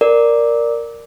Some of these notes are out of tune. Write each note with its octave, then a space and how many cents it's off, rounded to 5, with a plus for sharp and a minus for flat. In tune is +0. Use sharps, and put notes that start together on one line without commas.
A#4 +0 D5 +0